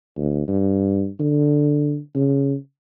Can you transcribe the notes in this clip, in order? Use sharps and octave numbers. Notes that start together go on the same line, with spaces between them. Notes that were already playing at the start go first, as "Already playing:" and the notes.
D2
G2
D3
C#3